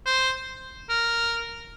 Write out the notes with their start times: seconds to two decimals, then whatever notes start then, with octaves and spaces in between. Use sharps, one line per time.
0.06 C5
0.90 A#4